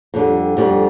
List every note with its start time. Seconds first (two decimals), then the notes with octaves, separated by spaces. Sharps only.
0.14 F2 D3 G3
0.57 F2 D3 G3